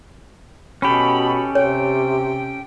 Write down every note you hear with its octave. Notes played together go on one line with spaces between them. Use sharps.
B2 C#4 G4 A4 B5
C3 C#5 G5